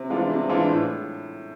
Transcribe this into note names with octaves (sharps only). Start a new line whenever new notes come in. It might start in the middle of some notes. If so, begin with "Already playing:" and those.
Already playing: C3
E3 G#3 D4 F4
C3
E3 G#3 D4 F4
A2